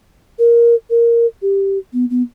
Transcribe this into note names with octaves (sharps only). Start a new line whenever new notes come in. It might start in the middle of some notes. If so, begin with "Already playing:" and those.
A#4
A#4
G4
B3
B3